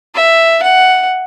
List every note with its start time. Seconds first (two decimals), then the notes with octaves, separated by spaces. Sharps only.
0.15 E5
0.63 F#5